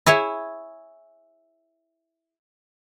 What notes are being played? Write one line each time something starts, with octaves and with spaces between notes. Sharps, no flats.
E4 G#4 C#5 E5